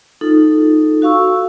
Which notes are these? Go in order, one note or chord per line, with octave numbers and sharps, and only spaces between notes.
D#4 F4 A4
F#4 F5 C#6 E6